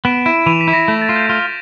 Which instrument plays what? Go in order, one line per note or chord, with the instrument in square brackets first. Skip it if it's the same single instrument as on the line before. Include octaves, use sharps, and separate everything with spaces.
[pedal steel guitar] B3 [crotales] D7 E7
[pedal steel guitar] E4 [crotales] D7 E7
[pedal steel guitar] E3 [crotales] D#7 F7
[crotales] B6
[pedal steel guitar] E4
[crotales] A#6
[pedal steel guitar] A3
[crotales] A6
[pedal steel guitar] F4
[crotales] G6
[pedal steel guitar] F4